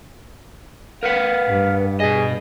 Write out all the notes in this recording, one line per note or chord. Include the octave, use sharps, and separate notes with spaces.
A#4 B4 F5 F#5
G2
B2 G#4 D#5